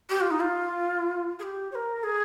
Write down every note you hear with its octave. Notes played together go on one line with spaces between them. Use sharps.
G4
F4
D#4
F4
G#4
G4
C#5
A#4
G#4